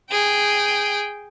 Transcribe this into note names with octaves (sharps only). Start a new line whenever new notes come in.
G#4 G5